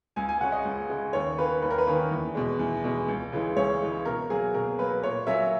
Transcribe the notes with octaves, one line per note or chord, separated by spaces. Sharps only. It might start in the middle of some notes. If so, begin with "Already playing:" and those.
C#2 G#5
G#5
C#3 G#3 C#4 F#5
D#5
C#2
C#3 G#3 C#4
D#2 C#5
D#3 A#3 C#4 B4
D#2 B4
A#4
B4
D#3 A#3 C#4
E2
B2 G#3
E2
B2 G#3
C#2
C#3 E3 G#3
C#2 C#5
C#3 E3 G#3
B2 A#4
F#3 A#3 G#4
B2 A#4
F#3 A#3 B4
A#2 C#5
F#3 A#3 C#4 E5